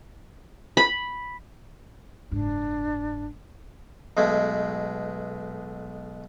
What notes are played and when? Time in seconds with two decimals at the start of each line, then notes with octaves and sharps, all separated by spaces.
0.77 B5
2.31 F#1 G#2 D4
4.17 B1 B2 G#3 A3